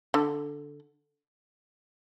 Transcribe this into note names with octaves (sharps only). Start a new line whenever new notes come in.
D3